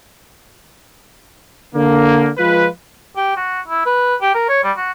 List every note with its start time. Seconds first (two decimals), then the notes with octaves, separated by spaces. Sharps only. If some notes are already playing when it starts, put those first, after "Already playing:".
1.75 D3 A#3
2.38 F3 G#3 F4 B4
3.17 G4
3.37 F#4
3.68 E4
3.86 B4
4.21 G4
4.35 A#4
4.49 C#5
4.64 G3
4.77 F#4